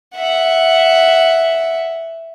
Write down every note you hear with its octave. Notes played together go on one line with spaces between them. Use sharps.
E5 F#5